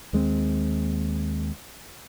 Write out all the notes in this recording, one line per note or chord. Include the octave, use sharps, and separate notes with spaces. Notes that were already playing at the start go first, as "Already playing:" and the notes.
D#2 G#3 A#3 C4